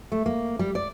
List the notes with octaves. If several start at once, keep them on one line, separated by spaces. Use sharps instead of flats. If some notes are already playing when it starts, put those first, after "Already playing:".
A3
A#3
G3
D5